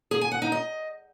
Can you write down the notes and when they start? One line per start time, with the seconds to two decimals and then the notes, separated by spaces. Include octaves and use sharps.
0.11 G#4
0.21 G#5
0.32 F#5
0.42 D#4
0.52 D#5